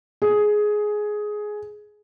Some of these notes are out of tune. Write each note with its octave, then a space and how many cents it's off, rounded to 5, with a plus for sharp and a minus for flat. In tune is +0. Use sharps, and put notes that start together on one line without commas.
G#4 +10